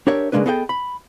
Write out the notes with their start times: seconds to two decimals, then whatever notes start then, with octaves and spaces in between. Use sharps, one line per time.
0.07 D4 G4 A#4 C#5 E5
0.32 C#3 F#3 G#3 A#3 D4 B4
0.46 B3 G#4 A4 D#5 E5 G5
0.69 B5